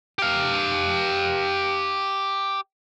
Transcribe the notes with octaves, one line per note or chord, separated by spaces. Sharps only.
G4 F5